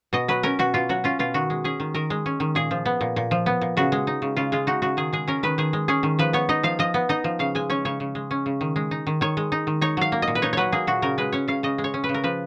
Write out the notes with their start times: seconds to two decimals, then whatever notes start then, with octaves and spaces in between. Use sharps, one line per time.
0.13 B2 D#5
0.28 F#3 B4
0.43 C#4 A#4
0.59 B2 F#4
0.74 B2 F4
0.89 F#3 F#4
1.04 C#4 F4
1.19 B2 F4
1.34 D#3 F#4
1.50 G#3
1.64 C#4 G#4
1.80 D#3
1.94 D#3 A#4
2.10 G#3
2.26 C#4
2.40 D#3
2.55 A#2 G#4
2.71 F3
2.86 B3
3.01 A#2
3.16 A#2
3.31 F3
3.46 B3
3.61 A#2
3.77 C#3 F#4
3.92 G#3
4.07 D#4
4.22 C#3
4.37 C#3 F4
4.52 G#3 F4
4.67 D#4 F#4
4.82 C#3 F#4
4.97 D#3 G#4
5.13 G#3 G#4
5.28 C#4 A#4
5.43 D#3 B4
5.58 D#3 G#4
5.73 G#3
5.88 C#4 G#4
6.03 D#3
6.19 F3 B4
6.33 B3 C#5
6.49 D#4 D#5
6.63 F3 F5
6.79 F3 D#5
6.94 B3
7.09 D#4 D#5
7.24 F3
7.39 C#3 F5
7.55 G#3 G#5
7.70 C#4 C#5
7.85 C#3 C#5
8.00 C#3
8.15 G#3
8.31 C#4
8.46 C#3
8.61 D#3
8.76 G#3
8.91 D#4
9.07 D#3
9.21 D#3 C#5
9.37 G#3
9.52 D#4
9.67 D#3
9.81 D#4 C#5
9.97 F#3 F5
10.12 A#3
10.22 D#5
10.28 A#2
10.35 B4
10.42 D#4 C#5
10.53 F#3 B4 C#5
10.72 A#3 G#4
10.87 A#2 F#4
11.02 C#3 A#4
11.18 G#3 B4
11.33 C#4 C#5
11.48 C#3 F5
11.63 C#3 D#5
11.78 G#3
11.84 C#5
11.94 C#4
12.04 B4
12.09 C#3
12.14 A#4
12.24 F3 B4